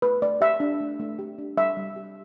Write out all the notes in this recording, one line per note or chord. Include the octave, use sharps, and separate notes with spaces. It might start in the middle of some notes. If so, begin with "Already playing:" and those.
A3 B4
A3 D5
G4 E5
D4
A3
A3
G4
D4
G3 E5
G3
G4